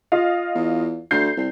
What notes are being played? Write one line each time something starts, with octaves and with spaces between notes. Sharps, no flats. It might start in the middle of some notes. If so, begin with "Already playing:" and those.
F4 D#5 F5
E2
D2 G6 C7
C2